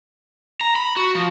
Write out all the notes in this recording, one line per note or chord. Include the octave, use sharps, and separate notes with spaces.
A#5
B5
F#4
F3